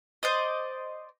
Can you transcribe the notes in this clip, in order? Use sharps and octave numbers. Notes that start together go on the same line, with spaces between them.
C5 D5 D#5